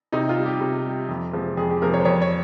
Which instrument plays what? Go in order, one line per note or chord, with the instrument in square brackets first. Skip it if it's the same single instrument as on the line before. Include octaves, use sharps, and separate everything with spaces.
[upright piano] C3 D#4
F4
G3
G4
C3
G3
F2
C3 F3 G#3
F2 G#4
G4
C3 F3 G#3 A#4
C#5
C5
F2 C#5
C#5